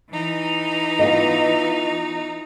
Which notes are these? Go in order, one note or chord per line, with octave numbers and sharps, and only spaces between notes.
E3 D#4
B3 F4 D#5